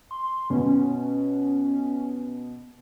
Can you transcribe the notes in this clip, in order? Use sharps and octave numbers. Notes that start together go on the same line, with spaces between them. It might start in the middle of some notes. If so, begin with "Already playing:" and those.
C6
B2 C#4